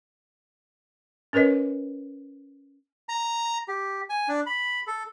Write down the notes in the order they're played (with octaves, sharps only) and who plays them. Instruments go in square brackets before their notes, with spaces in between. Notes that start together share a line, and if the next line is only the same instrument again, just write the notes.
[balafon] C#4 A#4 B4 C#5 D#5
[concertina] A#5
G4
G#5
D4
B5
A4